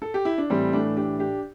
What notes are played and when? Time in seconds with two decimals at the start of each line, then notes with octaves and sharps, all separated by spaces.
0.02 A4
0.14 G4
0.25 E4
0.38 D4
0.50 A2 E3 G3 C4
0.73 A3 D4
0.97 D4 G4
1.19 D4 G4